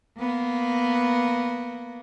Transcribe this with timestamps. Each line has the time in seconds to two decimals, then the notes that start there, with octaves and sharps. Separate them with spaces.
0.19 A#3 B3